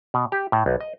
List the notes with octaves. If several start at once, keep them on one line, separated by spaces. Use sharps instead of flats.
B2
G4
A2
B1
D#5